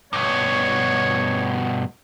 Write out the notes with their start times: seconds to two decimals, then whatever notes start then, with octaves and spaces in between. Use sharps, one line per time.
0.13 G2 B2 C#5